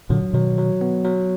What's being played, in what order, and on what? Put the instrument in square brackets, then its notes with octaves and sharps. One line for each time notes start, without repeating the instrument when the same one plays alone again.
[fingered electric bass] A#2 D3 [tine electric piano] F#3
[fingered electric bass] B2 D#3 [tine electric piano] F#3
[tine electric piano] F#3
B3
F#3